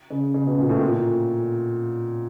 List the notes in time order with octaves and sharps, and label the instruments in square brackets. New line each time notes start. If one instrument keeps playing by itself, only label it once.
[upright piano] C#3
C#3
B2
A#2
A2
A#2